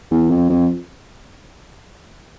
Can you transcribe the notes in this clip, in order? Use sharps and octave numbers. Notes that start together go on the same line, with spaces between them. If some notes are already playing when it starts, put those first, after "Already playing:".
E2
F2
F2